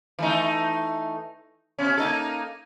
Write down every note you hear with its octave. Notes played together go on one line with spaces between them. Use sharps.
E3 A3 D#4
B2 C#4
A#3 D#4 A4